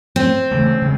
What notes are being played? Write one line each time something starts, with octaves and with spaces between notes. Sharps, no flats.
C4
C#3 E3 A3
C#3 G#3